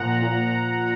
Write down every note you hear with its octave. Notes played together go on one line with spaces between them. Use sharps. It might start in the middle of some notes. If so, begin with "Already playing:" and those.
Already playing: A#2 F3 F#5 A#5
A#2